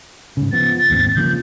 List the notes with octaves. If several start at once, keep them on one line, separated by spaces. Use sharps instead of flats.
G#2 C#3
F3 B3 A6
D#2 G#2 C4
C#3 F3 A#3 G6